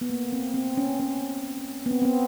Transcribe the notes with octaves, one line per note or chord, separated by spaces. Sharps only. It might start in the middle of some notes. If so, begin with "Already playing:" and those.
B3
A#3
C4
C4
C#4
C#4
B3
C4
C4
B3